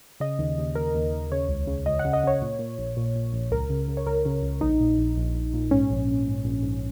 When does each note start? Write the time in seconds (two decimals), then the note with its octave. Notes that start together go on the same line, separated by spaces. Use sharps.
0.20 C#3 D#5
0.39 D#2
0.58 D#2
0.75 D#2 A#4
0.95 D#2
1.13 D#2
1.32 C#3 C#5
1.49 C#2
1.67 C#3
1.86 C#2 D#5
1.99 F#5
2.05 C#3
2.13 D#5
2.24 C#3 C#5
2.42 A#2
2.59 A#2
2.79 A#1
2.97 A#2
3.15 A#2
3.33 A#1
3.51 C#2 A#4
3.70 C#3
3.88 C#3
3.97 C#5
4.06 C#2 A#4
4.26 C#3
4.43 C#2
4.61 A#1 D#4
4.80 A#2
4.99 A#1
5.17 A#1
5.35 A#1
5.54 A#2
5.71 G#2 C#4
5.91 A#1
6.08 A#1
6.27 G#2
6.45 A#1
6.63 G#2